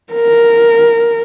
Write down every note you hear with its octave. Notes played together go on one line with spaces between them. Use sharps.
A#4